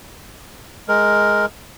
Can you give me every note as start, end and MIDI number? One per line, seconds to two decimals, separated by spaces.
0.88 1.46 56
0.88 1.46 70